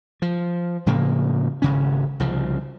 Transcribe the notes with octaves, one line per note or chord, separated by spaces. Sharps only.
F3
A2 C#3 F3 A#3
G#1 C#3 C#4
C2 C#3 F3